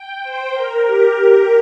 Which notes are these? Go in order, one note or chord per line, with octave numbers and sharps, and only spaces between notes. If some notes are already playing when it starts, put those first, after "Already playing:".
Already playing: G5
C5
A#4
G4